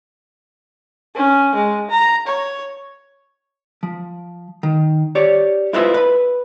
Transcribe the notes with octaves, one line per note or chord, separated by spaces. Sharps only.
C#4
G#3
A#5
C#5
F3
D#3
G4 C#5 D5
E4 F4 B4 C5 D#5 E5
B4 B5